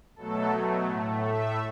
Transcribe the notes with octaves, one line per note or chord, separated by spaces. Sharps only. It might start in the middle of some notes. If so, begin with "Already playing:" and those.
B2 F#3 A3 A4
A2 A3
E5